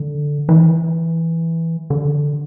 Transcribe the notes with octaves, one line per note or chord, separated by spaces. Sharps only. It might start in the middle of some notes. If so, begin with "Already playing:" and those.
Already playing: D3
E3
D3